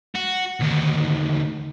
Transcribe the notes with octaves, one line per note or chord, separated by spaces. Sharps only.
F#4
D2 D#3